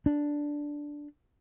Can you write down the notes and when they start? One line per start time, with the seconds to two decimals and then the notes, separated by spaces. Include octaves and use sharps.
0.06 D4